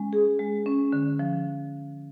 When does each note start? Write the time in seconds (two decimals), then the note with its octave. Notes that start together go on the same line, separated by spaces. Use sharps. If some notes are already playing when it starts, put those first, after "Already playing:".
Already playing: G#3 C#4
0.13 G#4
0.39 G#3
0.66 C#4
0.92 D3
1.19 F3